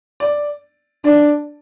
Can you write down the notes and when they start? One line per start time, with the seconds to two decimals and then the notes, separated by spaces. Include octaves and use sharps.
0.20 D5
1.04 D4 D5